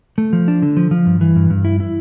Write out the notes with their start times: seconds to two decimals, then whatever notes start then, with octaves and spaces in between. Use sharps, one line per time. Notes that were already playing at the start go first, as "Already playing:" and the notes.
0.18 A3
0.33 F3
0.48 D4
0.62 D3
0.77 F3
0.91 F3
1.06 G2
1.21 E3
1.36 G2
1.50 G2
1.65 E4
1.80 E4